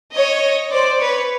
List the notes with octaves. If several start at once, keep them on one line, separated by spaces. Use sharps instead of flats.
C#5 D#5
C5 D5
B4 C#5